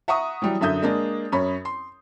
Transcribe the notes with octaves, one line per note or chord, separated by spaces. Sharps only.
E5 F#5 A#5 C#6 D#6
E3 F#3 G3
F#2 D3 E5 D#6 G6
G#3 A#3 D4
F#2 C#4 C#5 B5
C6